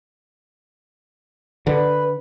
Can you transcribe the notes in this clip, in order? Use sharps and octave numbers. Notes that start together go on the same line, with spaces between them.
D3 B4